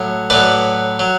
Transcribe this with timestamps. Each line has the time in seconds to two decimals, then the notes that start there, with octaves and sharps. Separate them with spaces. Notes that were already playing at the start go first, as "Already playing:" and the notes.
Already playing: A2 F#3
0.30 A2 F#3 B4 D5
0.99 F#3